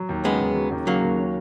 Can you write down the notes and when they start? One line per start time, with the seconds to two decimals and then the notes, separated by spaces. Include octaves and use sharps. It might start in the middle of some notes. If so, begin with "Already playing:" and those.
Already playing: F#3
0.09 D#2
0.25 C#3 G#3 B3
0.40 D#2
0.56 F#3
0.72 D#2
0.87 C#3 F#3 A#3
1.03 D#2
1.18 C#4